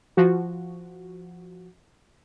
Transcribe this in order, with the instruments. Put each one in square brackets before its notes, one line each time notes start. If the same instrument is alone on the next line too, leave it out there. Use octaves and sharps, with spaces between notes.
[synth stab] F3 F#4